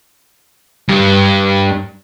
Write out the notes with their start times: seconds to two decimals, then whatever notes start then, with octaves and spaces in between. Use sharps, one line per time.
0.89 G2